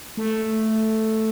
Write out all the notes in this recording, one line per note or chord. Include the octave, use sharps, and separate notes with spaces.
A3